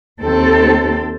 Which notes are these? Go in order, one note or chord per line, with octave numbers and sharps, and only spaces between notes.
D#2 C4 A4